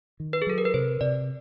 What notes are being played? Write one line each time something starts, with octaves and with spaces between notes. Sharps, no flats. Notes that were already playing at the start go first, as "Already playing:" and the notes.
D#3
B4
G#4
F#3 A4
A#4
B4
C3 C5
C3 D5